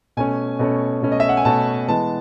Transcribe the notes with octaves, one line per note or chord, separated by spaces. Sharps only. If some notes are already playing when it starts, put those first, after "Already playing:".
B2 A3 C#4 G#5
B2 A3 C#4
B2 A3 C#4
D#5
E5
F#5
G#5
B2 A3 C#4 A5
E3 G#3 B3 A5